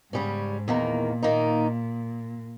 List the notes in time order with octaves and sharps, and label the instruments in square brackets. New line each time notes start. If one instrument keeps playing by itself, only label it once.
[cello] G#2 [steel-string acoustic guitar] C#3 G3 C#4
[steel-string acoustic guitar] E2 D#3 A#3 [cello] A#2
[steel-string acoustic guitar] D#3 A#3 D#4